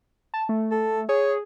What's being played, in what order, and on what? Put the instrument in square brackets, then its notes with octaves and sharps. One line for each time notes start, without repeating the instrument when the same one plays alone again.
[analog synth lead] A5
A3
[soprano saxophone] A4
[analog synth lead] G#4 [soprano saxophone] C#5